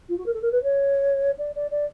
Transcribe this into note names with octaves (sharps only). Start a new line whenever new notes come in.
F4
F#4
A#4
A4
A#4
B4
C#5
D5
D5
D5